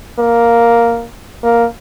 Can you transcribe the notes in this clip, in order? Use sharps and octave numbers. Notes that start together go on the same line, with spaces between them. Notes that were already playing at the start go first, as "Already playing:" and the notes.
A#3
A#3